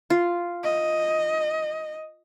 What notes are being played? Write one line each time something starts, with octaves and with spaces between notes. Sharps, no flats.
F4
D#5